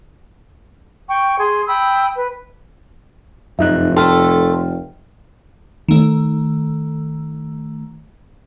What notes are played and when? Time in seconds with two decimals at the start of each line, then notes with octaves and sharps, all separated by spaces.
1.09 G5 C#6
1.39 G#4 C6
1.68 G5 B5 D#6 E6
2.15 B4
3.59 F1 F#2 D#4 E5 F#6
3.96 A3 A4 G5 C6 F6
5.89 D#3 A3